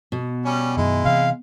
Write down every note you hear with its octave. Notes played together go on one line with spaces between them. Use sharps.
B2
G3 C#4
F#2 D#3 G#3 E4
C3 E3 F5